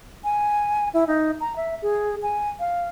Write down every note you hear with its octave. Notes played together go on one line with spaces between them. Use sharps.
G#5
E4
D#4
A#5
E5
G#4
G#5
F5